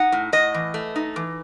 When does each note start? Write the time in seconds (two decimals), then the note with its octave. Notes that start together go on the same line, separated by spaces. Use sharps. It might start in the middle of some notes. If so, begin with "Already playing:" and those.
Already playing: D#4 F#5
0.12 A2
0.33 A2 D#5
0.54 E3
0.74 A3
0.96 D#4
1.16 E3